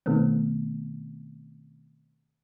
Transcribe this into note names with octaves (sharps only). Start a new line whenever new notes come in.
B2 D#3 A3 B3 C4